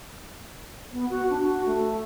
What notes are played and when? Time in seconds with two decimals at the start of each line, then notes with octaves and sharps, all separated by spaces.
0.93 B3
1.10 F#4
1.30 D4
1.44 F#4
1.66 A3